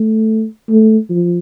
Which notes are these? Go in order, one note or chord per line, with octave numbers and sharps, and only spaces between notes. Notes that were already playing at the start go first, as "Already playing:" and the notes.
Already playing: A3
A3
F3